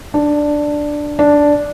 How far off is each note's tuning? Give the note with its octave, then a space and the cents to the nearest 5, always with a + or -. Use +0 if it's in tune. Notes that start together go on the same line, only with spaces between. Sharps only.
D4 +5
D4 -5